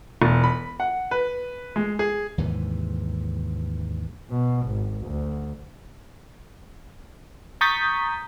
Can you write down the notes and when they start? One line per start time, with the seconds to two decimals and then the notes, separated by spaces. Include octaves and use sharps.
0.22 E1
0.44 B5
0.80 F#5
1.11 B4
1.76 G#3
1.99 G#4
2.38 D#2 G#2 C3 E3
4.30 B2
4.67 G#1
5.06 D2
7.61 A#5 C#6 D#6 G6 A6 B6